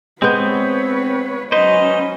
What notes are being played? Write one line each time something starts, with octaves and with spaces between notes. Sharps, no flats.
G#3 B3 C4 B4 C#5 G6
F#3 C#4 D#4 B4 C5 D#5